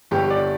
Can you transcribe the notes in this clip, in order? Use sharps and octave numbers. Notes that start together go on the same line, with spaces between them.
G1 G2 D3 G3 G4
D5